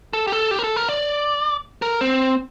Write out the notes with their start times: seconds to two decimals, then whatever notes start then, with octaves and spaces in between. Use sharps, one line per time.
0.13 A4
0.27 G4
0.32 A4
0.51 G4
0.59 A#4
0.64 A4
0.76 A#4
0.89 D5
1.82 A#4
2.01 C4